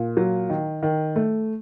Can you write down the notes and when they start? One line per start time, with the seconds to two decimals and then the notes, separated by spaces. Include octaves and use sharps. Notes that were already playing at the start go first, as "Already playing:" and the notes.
Already playing: A#2
0.17 F#3
0.50 D#3
0.83 D#3
1.16 A3